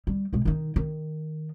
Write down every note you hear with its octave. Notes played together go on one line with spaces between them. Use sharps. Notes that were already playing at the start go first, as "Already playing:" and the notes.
G3
B2 G#3
D#3 D#4
D#3